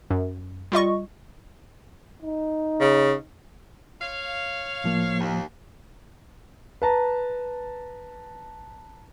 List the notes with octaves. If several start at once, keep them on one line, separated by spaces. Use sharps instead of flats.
F#2
G3 F4 D#5 C#6
D#4
C#3
C#5 F5
A2 F3 A#3
D#2
B4 A5 A#5